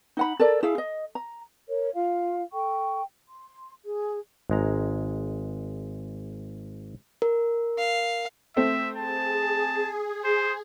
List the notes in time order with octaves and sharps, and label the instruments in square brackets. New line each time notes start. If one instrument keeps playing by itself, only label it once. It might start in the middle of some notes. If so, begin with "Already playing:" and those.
[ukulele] D#4 F#5 B5
A4 A#4 D5
E4 G#4 F5
D#5
A#5
[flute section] A#4 C#5
F4 F5
A4 G5 C#6
C6
G#4
[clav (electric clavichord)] G#1 G#3 A#5
[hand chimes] A#4
[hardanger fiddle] F5
[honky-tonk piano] A3 C4 [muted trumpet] E5
[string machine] G#4 [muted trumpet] A5
[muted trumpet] C5